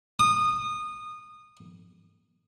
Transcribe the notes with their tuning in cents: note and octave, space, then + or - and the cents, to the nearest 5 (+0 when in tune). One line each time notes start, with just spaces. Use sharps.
D#6 -20